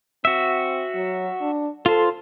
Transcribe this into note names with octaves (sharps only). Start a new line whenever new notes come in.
C4 F#4 E5
F#3
D4
F4 A4 C5